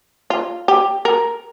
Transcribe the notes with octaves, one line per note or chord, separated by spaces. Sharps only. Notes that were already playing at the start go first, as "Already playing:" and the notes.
F4
G4
A#4